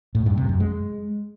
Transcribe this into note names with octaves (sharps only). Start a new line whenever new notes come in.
A2
G2
C3
F#2
G#3